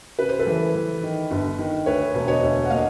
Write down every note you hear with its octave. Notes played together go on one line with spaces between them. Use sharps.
C#3 B4
C5
A4 B4
E3
E3
D#3
G1
D#3
D2 B4 C#5
E1
C#5 D#5
D2
F#5
A#3 D#5 F5